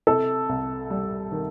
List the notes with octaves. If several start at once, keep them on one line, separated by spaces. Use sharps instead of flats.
C3 A4
C2
G3
D#3